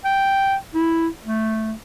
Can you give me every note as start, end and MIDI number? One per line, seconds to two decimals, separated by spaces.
0.05 0.55 79
0.75 1.07 64
1.24 1.72 57